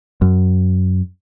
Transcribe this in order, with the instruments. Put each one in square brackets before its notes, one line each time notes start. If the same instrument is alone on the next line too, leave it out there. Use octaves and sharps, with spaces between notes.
[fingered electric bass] F#2